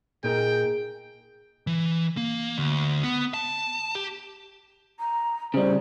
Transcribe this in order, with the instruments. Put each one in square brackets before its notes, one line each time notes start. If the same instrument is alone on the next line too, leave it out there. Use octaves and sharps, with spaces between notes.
[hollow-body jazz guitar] A#2 D#4 A#4 [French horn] G#4 [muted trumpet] G5
[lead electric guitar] E3
A#3
D2
B3
A5
G4
[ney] A#5
[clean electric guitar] C#3 G3 [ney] C5